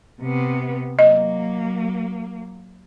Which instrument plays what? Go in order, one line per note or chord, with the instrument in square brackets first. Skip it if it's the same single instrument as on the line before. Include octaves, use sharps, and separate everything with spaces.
[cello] C3 B3
[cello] F#3 A#3 [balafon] D#5